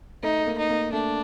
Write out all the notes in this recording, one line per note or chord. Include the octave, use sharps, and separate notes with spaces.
A3 D#4
A3
A#3
D#4
A#3
A3 D4